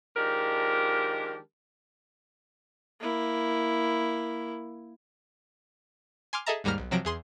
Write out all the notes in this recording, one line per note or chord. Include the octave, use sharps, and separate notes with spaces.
D#3 F3 G#3 D4 G4 A#4
A#3 E4
G#5 C6 D6 F6
G#4 A4 D#5 E5 A5 A#5
D#2 G#2 G3 A#3 A#5 F6
B1
C3 F3 F#3 A#6 D7
E2 G#4 C6